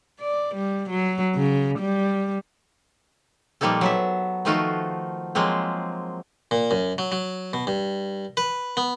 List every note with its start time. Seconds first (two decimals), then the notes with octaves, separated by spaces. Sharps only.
0.21 D5
0.55 G3
0.89 F#3
1.35 C#3
1.79 G3
3.61 A#2 F3 G3 A#3 D#4 A4
3.81 F#3 B3 E5
4.45 D#3 F3 A3 D#4 F4 F#4
5.35 F3 F#3 G#3 A#3 C4
6.51 A#2
6.71 F#2
6.98 F#3
7.12 F#3
7.53 B2
7.67 G2
8.37 B4
8.77 B3